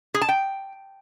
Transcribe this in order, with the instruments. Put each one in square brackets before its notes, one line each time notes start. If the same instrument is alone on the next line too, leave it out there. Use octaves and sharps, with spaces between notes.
[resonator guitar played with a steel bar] G#4
A5
G5